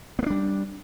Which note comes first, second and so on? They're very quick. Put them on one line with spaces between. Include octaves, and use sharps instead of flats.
B3 A#3 D4 G3